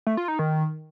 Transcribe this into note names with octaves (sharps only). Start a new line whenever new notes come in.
A3
F4
D#4
D#3